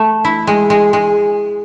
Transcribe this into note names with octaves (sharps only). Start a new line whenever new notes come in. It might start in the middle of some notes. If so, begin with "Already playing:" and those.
Already playing: A3
E4
G#3
G#3
G#3